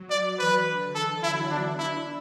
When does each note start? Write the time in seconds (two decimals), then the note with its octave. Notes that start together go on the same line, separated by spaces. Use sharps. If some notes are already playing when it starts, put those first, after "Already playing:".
Already playing: F#3
0.10 D5
0.38 E3 B4
0.67 D3
0.95 E3 A4
1.23 F#3 E4
1.50 B3 D4
1.79 D4 E4